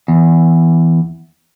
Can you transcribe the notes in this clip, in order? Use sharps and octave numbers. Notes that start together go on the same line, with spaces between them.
E2